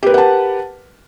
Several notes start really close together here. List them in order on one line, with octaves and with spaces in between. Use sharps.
G4 B4 A#4 F#5 A5